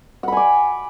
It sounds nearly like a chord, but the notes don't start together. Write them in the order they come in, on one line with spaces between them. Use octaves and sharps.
F#5 B5 G#5 D6